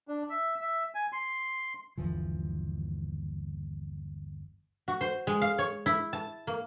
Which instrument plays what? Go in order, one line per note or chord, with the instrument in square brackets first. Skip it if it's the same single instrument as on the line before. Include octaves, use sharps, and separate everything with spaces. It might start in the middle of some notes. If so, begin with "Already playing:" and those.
[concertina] D4
E5
E5
G#5
C6
[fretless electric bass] G1 D#2 E3 F3
[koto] F#4
C5
G#3
F5
C#5
E4
A5
A#3